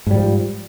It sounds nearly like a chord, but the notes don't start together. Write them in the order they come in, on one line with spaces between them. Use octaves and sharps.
G#2 G3 F3